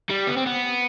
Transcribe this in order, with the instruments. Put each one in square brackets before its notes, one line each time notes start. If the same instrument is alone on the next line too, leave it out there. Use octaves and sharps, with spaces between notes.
[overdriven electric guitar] G3
B3
C4
B3